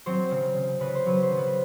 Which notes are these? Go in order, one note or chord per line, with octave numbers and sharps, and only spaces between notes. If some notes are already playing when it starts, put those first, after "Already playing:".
F#3 C4 C5
C#3
C#3
C#3 B4
C5
F#3 B4
C5
C#3
B3 B4